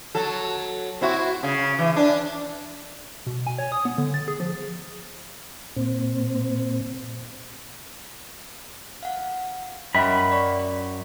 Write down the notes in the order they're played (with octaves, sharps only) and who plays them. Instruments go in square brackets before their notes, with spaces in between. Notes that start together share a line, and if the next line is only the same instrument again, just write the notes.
[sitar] F#3 A4
C4 E4 F#4
C#3
E3
D4
[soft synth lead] B2
G#5
C#5
D#6
B3
D3
A6
G#4
F3
[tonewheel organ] A#2 C4
[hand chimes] F5 F#5
[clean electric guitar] F#2 B5 [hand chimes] D#5 E5 G5
[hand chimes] D5 C#6